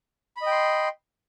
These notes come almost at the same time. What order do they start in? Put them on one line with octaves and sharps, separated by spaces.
B5 D#5 G5 C6